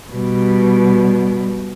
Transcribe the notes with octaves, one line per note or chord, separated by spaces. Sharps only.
B2 G3